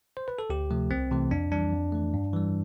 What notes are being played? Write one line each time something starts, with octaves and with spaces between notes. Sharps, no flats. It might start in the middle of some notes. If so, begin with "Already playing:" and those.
C5
B4
A4
D2 G4
C3 F3 A3
C2 C4
C3 E3 A3
F2 D4
E3 G3 D4
F2
E3 A3
G2
E3 G3